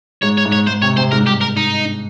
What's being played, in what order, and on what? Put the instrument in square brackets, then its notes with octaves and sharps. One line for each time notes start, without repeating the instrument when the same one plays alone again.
[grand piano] G#2 [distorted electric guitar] C#5
[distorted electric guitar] C#5
[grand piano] G#2
[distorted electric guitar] C#5
[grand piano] G#2 [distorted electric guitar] C5
[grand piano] C3 [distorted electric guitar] C#5
[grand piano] C3 [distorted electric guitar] C5
[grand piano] G#2 [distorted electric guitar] A#4
[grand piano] G2
[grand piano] G#2 [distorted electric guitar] G4
[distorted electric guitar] A#4
D#4